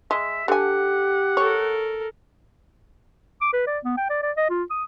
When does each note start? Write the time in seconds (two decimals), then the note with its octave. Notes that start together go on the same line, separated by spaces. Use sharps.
0.11 G#3 E5
0.48 D3 G4 F#5 G#5
1.37 A4 A#4 C#5
3.42 D6
3.53 B4
3.67 D5
3.84 B3
3.98 G5
4.10 D5
4.23 D5
4.37 D#5
4.50 F4
4.70 D#6